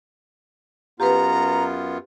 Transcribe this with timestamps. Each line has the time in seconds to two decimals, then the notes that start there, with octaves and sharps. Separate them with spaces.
1.00 F#2 B3 F4 G4 B4 A#5